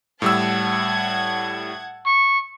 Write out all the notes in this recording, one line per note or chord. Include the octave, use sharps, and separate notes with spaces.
A2 G3 F#5 A5 E6 G#6
C#6